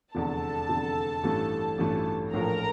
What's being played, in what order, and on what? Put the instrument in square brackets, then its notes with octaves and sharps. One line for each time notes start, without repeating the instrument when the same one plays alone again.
[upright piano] F1 E2 D3 [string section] A4 A5
[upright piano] F1 E2 D3
A1 G2 E3 A3
A1 G2 E3 A3
[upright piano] A#1 A2 F3 A3 [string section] A#4 A#5